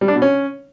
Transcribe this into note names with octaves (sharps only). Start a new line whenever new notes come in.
G3
D4
B2
C#4